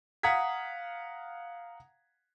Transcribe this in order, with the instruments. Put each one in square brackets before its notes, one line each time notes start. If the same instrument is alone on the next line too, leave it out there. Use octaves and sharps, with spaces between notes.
[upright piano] F5 F#5 A#5 D#6 G#6 B6